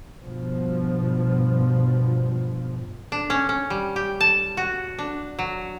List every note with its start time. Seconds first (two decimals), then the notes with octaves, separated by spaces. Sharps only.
0.22 G2 B2 F3
3.12 D4
3.30 C#4
3.49 C#4
3.70 G3
3.96 G4
4.21 A5
4.57 F#4
4.99 D4
5.39 F#3